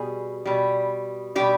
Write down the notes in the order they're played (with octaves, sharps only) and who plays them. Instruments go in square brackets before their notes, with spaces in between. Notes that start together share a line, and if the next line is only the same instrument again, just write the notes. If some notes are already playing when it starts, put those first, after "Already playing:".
Already playing: [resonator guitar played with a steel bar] B2 G3 G#4
B2 G3
B2 G3 G4